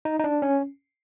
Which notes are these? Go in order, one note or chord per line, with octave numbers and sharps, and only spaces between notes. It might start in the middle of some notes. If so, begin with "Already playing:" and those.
D#4
D#4
D4
C#4